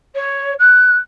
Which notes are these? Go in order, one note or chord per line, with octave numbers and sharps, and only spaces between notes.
C#5
F#6